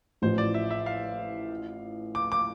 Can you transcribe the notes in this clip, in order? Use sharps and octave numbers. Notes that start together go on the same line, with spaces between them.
A1 A2 F3 C5
D5
E5
E5
F5
D6
D6